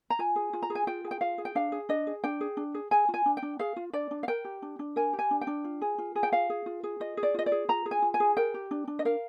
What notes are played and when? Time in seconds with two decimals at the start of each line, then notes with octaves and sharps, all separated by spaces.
0.10 A#5
0.19 F4 G#5
0.36 G#4
0.53 F4
0.62 A#5
0.70 G#4
0.75 G#5
0.87 F4 G5
1.04 G#4
1.11 G5
1.21 F4 F5
1.38 G#4
1.45 G5
1.55 D4 F5
1.72 G#4
1.89 D4 D#5
2.07 G#4
2.24 D4 G5
2.41 G#4
2.57 D4
2.74 G#4
2.91 G#4 G#5
3.09 F4
3.14 G#5
3.26 D4
3.37 G5
3.42 D4
3.59 G#4 F5
3.76 F4
3.93 D4 D5
4.11 D4
4.23 F5
4.28 A#4 G5
4.45 G4
4.62 D4
4.79 D4
4.96 A#4 G#5
5.13 G4
5.19 G#5
5.31 D4
5.41 G5
5.47 D4
5.64 F4
5.82 G#4
5.98 F4
6.16 G#4
6.23 G5
6.32 F4 F5
6.50 G#4
6.66 F4
6.84 G#4
7.00 F4 D#5
7.17 G#4
7.23 D5
7.34 F4 D#5
7.46 D5
7.52 G#4
7.69 F4 A#5
7.86 G#4
7.91 G#5
8.02 F4
8.14 G#5
8.20 G#4
8.37 A#4 G5
8.54 G4
8.71 D4
8.88 D4
8.99 D#5
9.05 A#4 F5